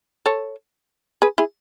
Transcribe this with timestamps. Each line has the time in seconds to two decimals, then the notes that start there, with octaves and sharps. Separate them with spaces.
0.26 A4 C#5
1.22 G#4 B4
1.38 E4 G#4